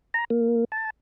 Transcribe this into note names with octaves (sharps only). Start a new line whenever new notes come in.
A#5
A#3
A5